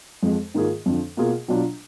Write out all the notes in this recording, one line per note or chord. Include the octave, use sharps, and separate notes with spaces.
F2 F3 G#3
G#2 D#3 A#3 F4 G#4
F2 D3 F3
B2 A#3 F4 G#4
B2 F#3 D4 F4